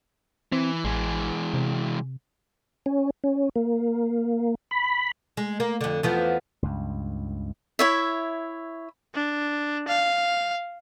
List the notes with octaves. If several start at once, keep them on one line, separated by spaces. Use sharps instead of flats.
E3 C4
A1 E3 G#3
C3
C#4
C#4
A#3
B5
G#3
A#3
F2 D3
E2 F3 B3
C#2 G2
E4 C#5 E5
D4
F5